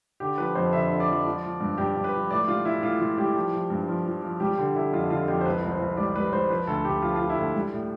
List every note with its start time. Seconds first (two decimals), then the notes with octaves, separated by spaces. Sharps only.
0.20 D3 G4
0.38 F3 B4
0.55 F2 C5
0.73 D3 E5
0.91 D3
1.00 D5
1.09 F3
1.25 F3
1.44 F3
1.61 G2
1.78 G2 G4
1.96 G2
2.04 B4
2.14 F3
2.30 A2 D5
2.48 G3 F4
2.65 E3 E4
2.82 A2 F4
3.01 E3 F4
3.18 G3 G4
3.35 F3
3.53 F3
3.70 G2
3.87 F3
4.06 F3
4.22 F3
4.40 G3 G4
4.58 D3 G4
4.75 D3 E4
4.92 F2 F4
5.10 D3 F4
5.28 F2 G4
5.41 C5
5.46 C2 B4
5.63 C2
5.71 C5
5.80 C2
5.97 G3 D5
6.16 G3 B4
6.32 G3 C5
6.50 F3 B4
6.67 D2 A4
6.85 D2 G4
7.02 F3 F4
7.16 F3 F4
7.30 E4
7.38 D2
7.55 G3
7.73 A2